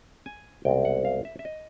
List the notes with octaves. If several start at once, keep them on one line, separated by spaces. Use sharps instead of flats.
G#5
C2 B2 G#3 C4 G5
F#5
F5
E5
E5
D#5